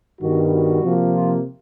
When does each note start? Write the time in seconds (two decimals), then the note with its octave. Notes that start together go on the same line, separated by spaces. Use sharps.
0.21 G2 D#3 G3 B3 F#4
0.52 F#4
0.83 C3 F3 A#3
1.12 F4